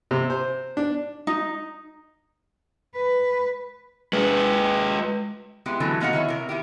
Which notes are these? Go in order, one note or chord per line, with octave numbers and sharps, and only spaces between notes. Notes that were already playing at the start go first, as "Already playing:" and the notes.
C3
C5
D4
D#4
B4
G#3 B4
G#3 B3 E4 G4
D3 E3 F#3 A3
B2 A#3 D#4 F#4 F5 F#5
D#3 E4 C#5
C3 A#4
D#3 E4 G4